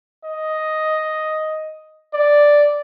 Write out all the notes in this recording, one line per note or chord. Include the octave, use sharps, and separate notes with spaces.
D#5
D5